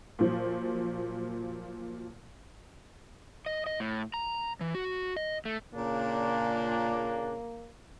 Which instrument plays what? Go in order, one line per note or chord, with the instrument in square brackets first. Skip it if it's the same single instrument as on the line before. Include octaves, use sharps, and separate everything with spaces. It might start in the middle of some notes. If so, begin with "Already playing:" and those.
[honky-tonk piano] A#2 F3 F#3
[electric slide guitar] D#5
D#5
A2
A#5
E3
F#4
D#5
A3
[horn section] A#2 C#3 D4 [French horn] A#3